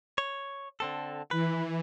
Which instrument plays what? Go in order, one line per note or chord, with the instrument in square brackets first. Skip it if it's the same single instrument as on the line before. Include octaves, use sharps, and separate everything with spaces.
[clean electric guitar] C#5
D3 C4 A4
[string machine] E3 [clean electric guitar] B4